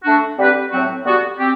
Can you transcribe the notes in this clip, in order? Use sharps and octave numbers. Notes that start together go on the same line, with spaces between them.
A3 D4 F#4
D3 G3 C4 G4 B4
A2 F#3 C4 F#4
D3 G3 B3 F#4
C4 G4